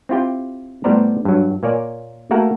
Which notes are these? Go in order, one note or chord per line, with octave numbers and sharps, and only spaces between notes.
C4 E4 F4 G4 G5
A2 G3 B3 C5 D5 A#5
G2 F#3
A#2 A#3 C#5 D5 G#5
A3 A#3 F#4 A4 A#4 F#5